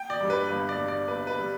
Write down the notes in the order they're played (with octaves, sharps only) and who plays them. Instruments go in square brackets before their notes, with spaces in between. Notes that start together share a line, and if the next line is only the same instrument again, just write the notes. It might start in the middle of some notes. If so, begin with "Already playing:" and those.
Already playing: [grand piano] G5
D5
G2 G3
B4
G1 B4
D5
G2 G3
D5
G1 B4
B4
G3